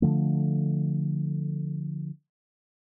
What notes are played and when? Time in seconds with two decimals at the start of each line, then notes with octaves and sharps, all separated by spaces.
0.02 D3 F3 A3